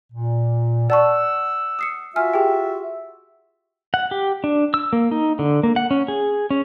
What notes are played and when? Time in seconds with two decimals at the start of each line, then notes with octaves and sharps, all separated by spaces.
0.13 A#2
0.90 D5 F#5 A5 C#6 E6
1.79 D#6 C7 C#7
2.16 F4 F#4 E5 G#5 F6
2.34 G4 G#4 G5
3.94 F#5
4.11 G4
4.44 D4
4.74 E6
4.93 A#3
5.11 D#4
5.39 D3
5.63 A#3
5.76 F#5
5.91 C#4
6.08 G#4
6.50 C#4